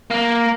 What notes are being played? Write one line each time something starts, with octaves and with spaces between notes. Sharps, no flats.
A#3